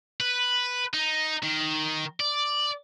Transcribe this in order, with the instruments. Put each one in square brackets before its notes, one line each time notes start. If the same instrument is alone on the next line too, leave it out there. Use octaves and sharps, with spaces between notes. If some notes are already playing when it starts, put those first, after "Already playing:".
[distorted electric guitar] B4
D#4
D#3
D5